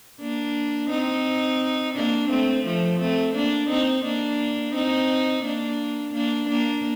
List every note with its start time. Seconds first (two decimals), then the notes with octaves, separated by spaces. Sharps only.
0.20 A#3 D4
0.90 C4 D#4
1.95 A#3 D4
2.30 A3 C4
2.65 F3 A3
3.00 A3 C4
3.34 A#3 D4
3.69 C4 D#4
4.05 A#3 D4
4.74 C4 D#4
5.44 A#3 D4
6.14 A#3 D4
6.49 A#3 D4